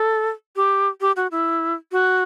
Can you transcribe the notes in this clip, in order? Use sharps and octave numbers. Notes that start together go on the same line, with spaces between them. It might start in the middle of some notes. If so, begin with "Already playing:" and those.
Already playing: A4
G4
G4
F#4
E4
F#4